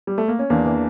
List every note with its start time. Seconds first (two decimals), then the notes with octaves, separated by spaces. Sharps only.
0.07 G3
0.18 A3
0.28 A#3
0.39 C#4
0.50 E2 A#3 D4
0.66 E3